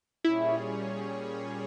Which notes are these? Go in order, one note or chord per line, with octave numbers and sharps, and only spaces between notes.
A#2 G3 C#4 E4 G#4 C#5